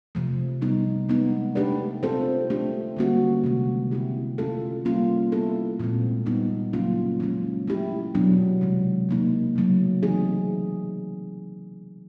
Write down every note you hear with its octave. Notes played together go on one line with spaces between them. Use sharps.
C3 F3 A3
G3 B3 D#4
G#3 B3 D#4
A3 D4 G4 B4 D5
C4 F4 A4 C5
A3 D4 G4
D3 G3 A#3 C#4 F#4
C3 D#3 G#3
C4 E4 G4
A3 C#4 F4 A4
G3 A#3 C#4 F4
B3 E4 A4
A#2 F3 G#3 C4
G3 B3 D#4
C#3 F#3 A#3 C#4 F4
F3 G#3 C#4
A3 C#4 E4 G4
B2 F#3 B3 D4
C3 D#3 G#3
F#3 A#3 D#4
C#3 F#3 A3
E3 A3 C4 D#4 G#4